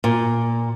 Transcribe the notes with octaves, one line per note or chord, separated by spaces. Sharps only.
A#2